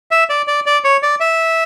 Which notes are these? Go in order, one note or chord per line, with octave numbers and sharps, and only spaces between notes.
E5
D5
D5
D5
C#5
D5
E5